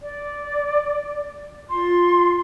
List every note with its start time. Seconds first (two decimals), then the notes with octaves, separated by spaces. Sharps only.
0.01 D5
1.70 F4 C6